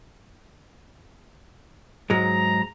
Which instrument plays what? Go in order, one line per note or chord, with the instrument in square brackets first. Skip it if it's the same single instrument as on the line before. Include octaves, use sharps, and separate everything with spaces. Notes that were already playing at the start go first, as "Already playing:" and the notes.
[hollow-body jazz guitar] G#2 F#3 G#3 [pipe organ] A#5